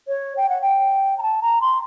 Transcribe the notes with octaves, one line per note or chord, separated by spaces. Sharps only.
C#5
G5
F#5
G5
A#5
A5
A#5
C6